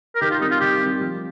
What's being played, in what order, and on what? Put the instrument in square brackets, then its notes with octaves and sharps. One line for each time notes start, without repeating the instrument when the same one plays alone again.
[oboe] A#4
[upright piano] D#3 [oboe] G4
[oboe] F4
[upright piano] G3 C4 [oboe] D#4
[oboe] F4
[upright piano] D#3 [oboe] G4
[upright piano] G3 C4
F3